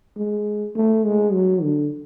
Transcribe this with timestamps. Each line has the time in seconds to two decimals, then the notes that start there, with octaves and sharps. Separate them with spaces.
0.16 G#3
0.75 A3
1.04 G#3
1.33 F#3
1.62 D3